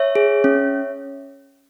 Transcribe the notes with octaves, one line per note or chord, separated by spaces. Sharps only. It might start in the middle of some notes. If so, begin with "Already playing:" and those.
Already playing: C#5 E5
G#4
C#4